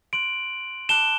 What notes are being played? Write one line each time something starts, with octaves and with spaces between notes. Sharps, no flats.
C6 F#6 D7 F#7
A5 D6 F#6 E7 G7